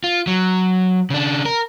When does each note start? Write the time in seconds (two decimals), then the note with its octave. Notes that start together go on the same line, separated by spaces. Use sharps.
0.04 F4
0.27 F#3
1.10 C#3 D4
1.46 A#4